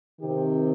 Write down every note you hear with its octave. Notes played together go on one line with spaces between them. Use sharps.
C3 D#3 C4 G4